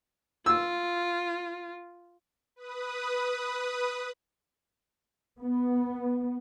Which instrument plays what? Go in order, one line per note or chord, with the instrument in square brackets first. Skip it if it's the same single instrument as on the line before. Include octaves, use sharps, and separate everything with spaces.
[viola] F4 [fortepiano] E6
[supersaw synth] B4 D#6
[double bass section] B3